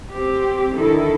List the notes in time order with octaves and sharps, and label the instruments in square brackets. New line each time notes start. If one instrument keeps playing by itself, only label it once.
[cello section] C4 G4
D3 D#3 E4 A4